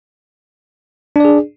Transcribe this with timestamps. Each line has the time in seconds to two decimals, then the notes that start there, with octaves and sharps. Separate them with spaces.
1.16 D4
1.20 D5
1.25 G#4